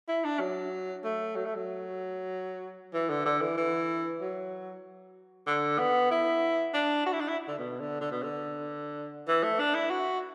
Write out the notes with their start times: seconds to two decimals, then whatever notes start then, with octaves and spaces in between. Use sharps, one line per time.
0.08 E4
0.24 D4
0.40 F#3
1.04 A3
1.36 F#3
1.46 A3
1.55 F#3
2.94 E3
3.09 D3
3.25 D3
3.41 E3
3.57 E3
4.21 F#3
5.47 D3
5.78 B3
6.11 E4
6.74 D4
7.06 F#4
7.13 E4
7.20 D4
7.28 E4
7.48 D3
7.58 B2
7.80 D3
8.01 D3
8.11 B2
8.23 D3
9.28 E3
9.43 A3
9.59 D4
9.74 E4
9.90 F#4